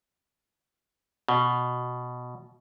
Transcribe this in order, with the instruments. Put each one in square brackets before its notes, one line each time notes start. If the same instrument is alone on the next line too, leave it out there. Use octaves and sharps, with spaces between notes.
[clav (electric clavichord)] B2